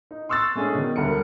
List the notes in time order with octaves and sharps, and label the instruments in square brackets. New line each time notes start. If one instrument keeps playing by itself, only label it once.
[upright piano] D#4
C6 C#6 E6 F#6 A6
G#3 A3 C#4 D4 G#4
B2 D#3
E1 D2 D3 G3 A#4 C#7